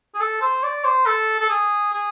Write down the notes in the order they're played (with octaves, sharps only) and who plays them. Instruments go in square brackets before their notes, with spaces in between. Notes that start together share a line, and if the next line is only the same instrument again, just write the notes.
[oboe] G#4
A4
C5
D5
C5
A4
A4
G#4
G#4